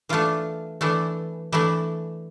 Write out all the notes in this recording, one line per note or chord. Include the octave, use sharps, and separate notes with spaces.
E3 A3 D4 F4
E3 A3 D4
E3 A3 D4 E4